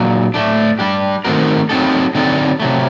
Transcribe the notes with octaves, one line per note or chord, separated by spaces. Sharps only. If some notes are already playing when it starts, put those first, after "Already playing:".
Already playing: A#2 F#3
A2 A3 D4
G3 D4 G4
D#3 A3 C4 F#4 A#4
F#3 C4 D#4 A4
D3 F#3 C4 D#4 A4
C3 F#3 A3